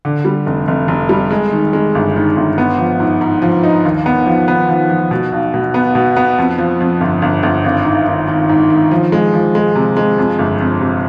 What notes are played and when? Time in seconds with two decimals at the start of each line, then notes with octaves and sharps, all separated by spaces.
0.05 D3
0.25 G3
0.46 F1
0.68 F1
0.88 F1
1.09 G3
1.31 G#3
1.52 D#3
1.73 G#3
1.95 G1
2.16 D#3
2.37 G1
2.58 B3
2.78 F3
3.00 G#2
3.21 G#2
3.42 F3
3.63 D#4
3.85 D#2
4.06 B3
4.26 F3
4.48 B3
4.69 F3
4.90 F3
5.11 B2
5.32 B1
5.54 B2
5.74 B3
5.95 B2
6.17 B3
6.38 F2
6.58 F3
6.80 F2
7.01 G1
7.22 G1
7.43 G1
7.64 G#1
7.85 G#2
8.07 D#3
8.28 D#3
8.49 G#2
8.70 D#3
8.91 F3
9.12 G#3
9.33 F3
9.55 G#3
9.75 C3
9.97 G#3
10.18 F2
10.39 G1
10.60 F2
10.81 C3